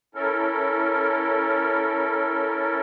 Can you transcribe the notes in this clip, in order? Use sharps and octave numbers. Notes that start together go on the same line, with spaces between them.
C#4 E4 A4 A#4